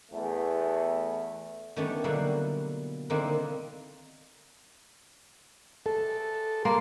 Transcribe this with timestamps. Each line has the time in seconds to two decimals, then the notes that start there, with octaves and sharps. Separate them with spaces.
0.11 E2 A3
1.76 D#3 G3 A3 B3 C#4 D4
2.04 B2 D3 F#3 G3 A#3 E4
3.10 D3 D#3 A#3 C4 D#4 E4
5.86 A4
6.65 A#3 C6